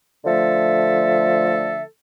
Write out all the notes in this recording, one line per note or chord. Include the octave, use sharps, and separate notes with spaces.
D3 F3 A3 A4 E5